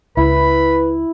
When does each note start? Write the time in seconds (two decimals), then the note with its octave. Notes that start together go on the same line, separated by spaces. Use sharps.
0.17 C#2 E4 B4 B5